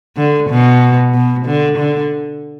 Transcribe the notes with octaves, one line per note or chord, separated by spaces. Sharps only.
D3
B2
B2
D3
D3